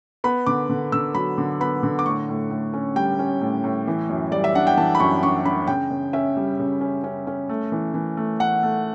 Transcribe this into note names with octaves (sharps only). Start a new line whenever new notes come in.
B3 B5
D3 D6
D3
D3 E6
F#3 B5
D3
B3 B5
D3
D6
A2 C#6
A2
A2
C#4
G3 G5
C#4
A2
A2
E3
F#2
G3 D5
E5
D4 F#5
G5
E3 A5
B5
F#2 C#6
D4 C#6
D4 B5
C#3 G5
C#3
C#4 E5
G3
C#3
C#4
C#4
C#4
A3
E3
E3
A3
A3 F#5
A3